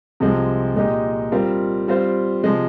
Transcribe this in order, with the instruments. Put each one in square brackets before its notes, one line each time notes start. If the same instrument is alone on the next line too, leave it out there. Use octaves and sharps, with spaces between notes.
[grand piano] C2 C3 F3 G#3 C4
A#2 G#3 D#4 G4
G3 C4 F4 A#4
G3 C4 F4 C5
C3 F3 G#3